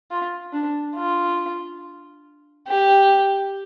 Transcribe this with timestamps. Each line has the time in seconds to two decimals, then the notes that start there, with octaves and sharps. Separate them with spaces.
0.11 F4
0.53 D4
0.96 F4
2.68 G4